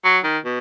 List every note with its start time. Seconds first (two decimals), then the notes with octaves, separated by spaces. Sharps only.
0.04 F#3
0.24 D#3
0.45 B2